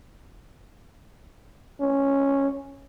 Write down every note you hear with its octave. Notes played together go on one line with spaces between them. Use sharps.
C#4